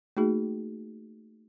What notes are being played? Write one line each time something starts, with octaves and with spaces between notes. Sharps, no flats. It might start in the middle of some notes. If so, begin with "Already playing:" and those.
A3 A#3 D#4 F#4 G#4